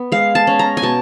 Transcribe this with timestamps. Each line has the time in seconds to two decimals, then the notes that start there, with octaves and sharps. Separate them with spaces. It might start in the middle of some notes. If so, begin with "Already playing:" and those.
Already playing: B3
0.12 G#3 F5
0.35 A5
0.47 C#4
0.59 A#5
0.77 G#5
0.82 B2 A5